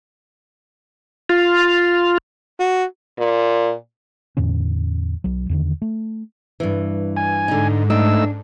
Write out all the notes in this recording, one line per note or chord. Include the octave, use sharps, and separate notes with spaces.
F4
F#4
A#2
E2 A2 D3 C#4
B1 F#3
E2 D3 D#3
A3
G2 E3
G#5
G#2 D3 D#4
A3 D4 D#4 E6